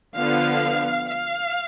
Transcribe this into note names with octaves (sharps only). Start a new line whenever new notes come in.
D3 F3 B3 F5
F5